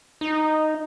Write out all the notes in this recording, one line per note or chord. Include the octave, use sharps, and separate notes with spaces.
D#4